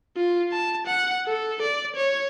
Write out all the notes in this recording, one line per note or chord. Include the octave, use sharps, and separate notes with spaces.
F4
A5
F#5
A4
D5
C#5